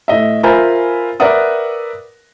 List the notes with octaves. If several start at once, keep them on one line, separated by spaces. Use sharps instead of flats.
A2 D#5 E5
F4 A#4 C5 E5 G#5 B5
A#4 B4 D5 E5 F#5 D#6